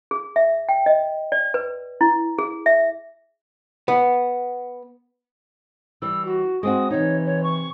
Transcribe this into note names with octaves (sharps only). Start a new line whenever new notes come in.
G#4
E5
G5
D#5
D5
B4
E4
G#4
E5
B3
E3 G3 E6
F#4
G#3 C4 F#4 D#6
C3 E3 D#4 C#5
C#5
C#6